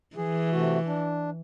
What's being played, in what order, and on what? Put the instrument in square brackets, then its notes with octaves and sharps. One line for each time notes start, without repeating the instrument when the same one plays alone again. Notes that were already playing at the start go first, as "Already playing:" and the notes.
[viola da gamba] E3 [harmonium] G#4
[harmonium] C3 A3 F#4
D4